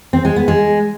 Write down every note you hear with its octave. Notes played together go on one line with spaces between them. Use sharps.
C4
G#3
B3
G#3